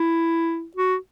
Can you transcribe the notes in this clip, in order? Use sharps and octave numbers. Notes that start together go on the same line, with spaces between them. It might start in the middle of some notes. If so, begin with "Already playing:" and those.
Already playing: E4
F#4